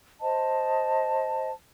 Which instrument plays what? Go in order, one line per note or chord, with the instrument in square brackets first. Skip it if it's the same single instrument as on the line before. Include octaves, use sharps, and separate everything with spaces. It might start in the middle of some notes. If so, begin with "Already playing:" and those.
[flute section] C5 D#5 A5